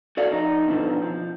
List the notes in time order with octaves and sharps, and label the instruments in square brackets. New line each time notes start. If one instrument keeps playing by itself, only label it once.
[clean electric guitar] F#4 A4 D5 F5
F2 D#4
B2 D3 E3 F3 C4 D#4
F3